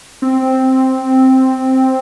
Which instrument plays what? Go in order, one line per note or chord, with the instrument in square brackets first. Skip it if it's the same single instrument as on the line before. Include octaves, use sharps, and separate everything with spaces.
[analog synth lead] C4